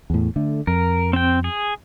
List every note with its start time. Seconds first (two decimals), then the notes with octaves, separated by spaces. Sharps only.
0.10 E2 A2
0.36 D3 A3
0.67 F2 A#4
1.13 C4 G5
1.44 G#4